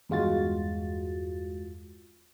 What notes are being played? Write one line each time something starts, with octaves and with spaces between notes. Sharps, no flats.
E2 G2 G#3 F4 F#4 A6